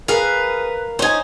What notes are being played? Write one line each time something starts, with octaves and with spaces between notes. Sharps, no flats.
G#4 A#4 B4 F5
C#4 D#4 C5 G#5